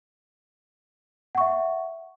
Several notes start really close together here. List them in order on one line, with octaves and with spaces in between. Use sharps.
F#5 C#6 E5